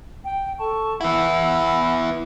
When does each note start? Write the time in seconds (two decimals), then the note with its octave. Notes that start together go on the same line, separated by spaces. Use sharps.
0.25 G5
0.59 A4 A5 C#6
1.01 B3 E4 F#5 E6